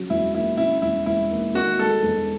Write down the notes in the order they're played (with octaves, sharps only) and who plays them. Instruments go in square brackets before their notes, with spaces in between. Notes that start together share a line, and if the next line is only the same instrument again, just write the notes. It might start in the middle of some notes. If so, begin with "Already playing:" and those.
Already playing: [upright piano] C#3 F#3
[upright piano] E1 [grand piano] E4
[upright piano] D#2 [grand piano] E4
[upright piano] C#3 [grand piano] E4
[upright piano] E1 [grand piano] E4
[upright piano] E1 [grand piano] E4
[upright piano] D#2
[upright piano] D#3 [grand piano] F#4
[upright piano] G#3 [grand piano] A4
[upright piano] E1